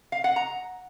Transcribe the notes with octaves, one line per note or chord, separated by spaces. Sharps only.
F5
F#5
A#5